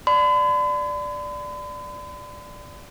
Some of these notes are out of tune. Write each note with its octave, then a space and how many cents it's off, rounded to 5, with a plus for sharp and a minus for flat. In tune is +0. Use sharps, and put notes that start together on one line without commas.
D5 +0 B5 +45